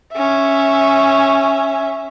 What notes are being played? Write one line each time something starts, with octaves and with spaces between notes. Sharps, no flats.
C#4 E5